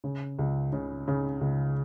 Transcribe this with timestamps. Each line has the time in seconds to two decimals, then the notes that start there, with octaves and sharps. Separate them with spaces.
0.04 C#3
0.39 C#2
0.73 C#3
1.08 C#3
1.41 C#2